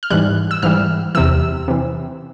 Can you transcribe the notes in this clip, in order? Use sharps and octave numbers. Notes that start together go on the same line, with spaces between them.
F6
G#2 E3 G3 F#6
E6
G#2 E3 G3 F6
E2 C3 E3 E6
C3 E3